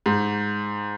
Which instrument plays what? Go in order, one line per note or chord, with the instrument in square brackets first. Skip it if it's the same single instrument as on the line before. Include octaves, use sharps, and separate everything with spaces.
[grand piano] G#2